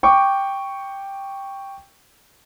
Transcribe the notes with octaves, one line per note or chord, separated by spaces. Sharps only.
G5 C#6 D6